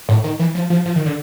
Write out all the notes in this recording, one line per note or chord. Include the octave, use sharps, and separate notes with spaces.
A2
D#3
E3
F3
F3
F3
D#3
D3